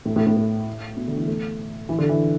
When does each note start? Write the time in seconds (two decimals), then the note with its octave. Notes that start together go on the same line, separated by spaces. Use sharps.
0.05 A2
0.16 A2
0.27 A2
0.37 A2
0.97 B2
1.08 D3
1.17 E3
1.28 A3
1.89 E3
1.98 D3
2.09 E3